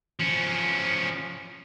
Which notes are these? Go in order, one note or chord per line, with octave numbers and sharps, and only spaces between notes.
F3 C#4